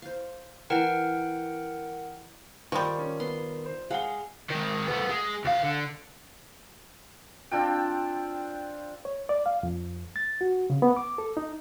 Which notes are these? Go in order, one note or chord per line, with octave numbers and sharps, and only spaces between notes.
C5 F5
E3 A#4 F#5 G5 A#5
D#3 F3 G3 C#6
C#4
B3 C6
C5
G#3 F5 F#5 G7
D#3 G#3
A3 B3
G#3
D2 F5
D3
C4 D4 F4 G5
C#5
D5
F5
F2
A6
F#4
C#3
B3
D6
A4
D#4